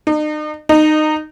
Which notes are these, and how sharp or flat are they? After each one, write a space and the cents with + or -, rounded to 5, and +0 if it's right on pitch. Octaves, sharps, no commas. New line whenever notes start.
D#4 -40
D#4 -20